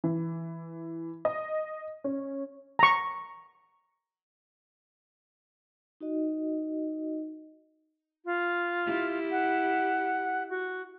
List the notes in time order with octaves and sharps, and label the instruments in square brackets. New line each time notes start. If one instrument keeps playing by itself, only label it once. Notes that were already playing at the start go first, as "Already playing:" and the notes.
[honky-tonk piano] E3
D#5
C#4
[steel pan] A#5 C#6
[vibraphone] D#4 F#4 D#5
[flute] F4
[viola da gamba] E4 G4
[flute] F#5
F#4